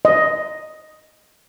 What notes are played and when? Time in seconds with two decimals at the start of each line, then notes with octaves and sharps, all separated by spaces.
0.05 D#5